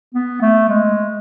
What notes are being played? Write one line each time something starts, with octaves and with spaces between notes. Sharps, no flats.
B3
A3
G#3